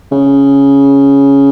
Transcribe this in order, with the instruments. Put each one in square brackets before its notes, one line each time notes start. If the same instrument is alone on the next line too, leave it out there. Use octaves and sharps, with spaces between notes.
[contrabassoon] C#3